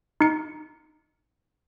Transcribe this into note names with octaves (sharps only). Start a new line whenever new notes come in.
D#4 C#7